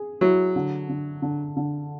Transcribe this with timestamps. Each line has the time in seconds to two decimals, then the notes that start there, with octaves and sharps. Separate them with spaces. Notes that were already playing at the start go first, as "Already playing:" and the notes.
Already playing: G#4
0.21 F#3 E4
0.56 D3
0.89 D3
1.22 D3
1.57 D3